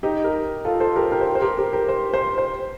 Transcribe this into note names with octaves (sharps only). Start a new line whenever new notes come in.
D#4 G4
G4 A#4
F4 A4
A4 C5
G4 A#4
G4 A#4
C5
G4 A#4
C5
G4 A#4
G4 A#4
G4 A#4
C5
C5
C5